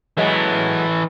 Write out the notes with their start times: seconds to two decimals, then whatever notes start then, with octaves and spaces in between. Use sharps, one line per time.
0.17 E3 F#3 G#3 A3 B3